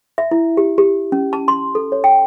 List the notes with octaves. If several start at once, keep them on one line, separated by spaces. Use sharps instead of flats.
E5
E4
G4
G4
C#4
A5
C6
A4
C#5
G5